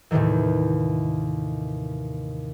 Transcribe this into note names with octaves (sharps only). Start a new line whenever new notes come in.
D#2 A2 C3 D#3 E3